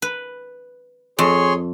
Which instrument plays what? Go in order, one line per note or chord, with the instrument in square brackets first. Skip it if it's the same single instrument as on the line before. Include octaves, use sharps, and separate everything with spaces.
[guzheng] B4
[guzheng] F2 [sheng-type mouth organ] G#4 C#5 C6